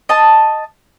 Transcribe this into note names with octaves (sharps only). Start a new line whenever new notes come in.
D#5 A5